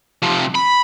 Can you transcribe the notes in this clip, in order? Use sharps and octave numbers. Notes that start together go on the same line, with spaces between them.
C3 F3
B5